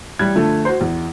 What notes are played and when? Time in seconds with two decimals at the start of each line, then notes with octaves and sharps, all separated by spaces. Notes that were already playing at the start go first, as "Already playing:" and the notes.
0.19 A1 G3 F#6 G#6
0.35 D3 F3 A3
0.65 F#4 C5
0.81 E2